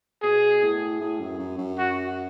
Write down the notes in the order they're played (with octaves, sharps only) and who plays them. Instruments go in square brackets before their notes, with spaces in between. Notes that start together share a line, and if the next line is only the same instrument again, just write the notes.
[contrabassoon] B2 [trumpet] G#4
[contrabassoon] A2
A2
F#2
F#2
F#2
[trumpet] F#4